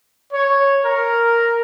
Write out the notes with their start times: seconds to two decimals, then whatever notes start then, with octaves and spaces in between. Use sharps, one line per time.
0.33 C#5
0.86 A#4